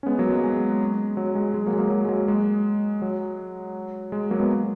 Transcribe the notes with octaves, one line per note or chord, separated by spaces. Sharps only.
C#4
G#3 B3
F#3 A#3
G#3
G#3
F#3
G#3
G#3
F#3 A#3
G#3
F#3 A#3
F#3
G#3
F#3
G#3
F#3
G#3
F#3 A#3
G#3 B3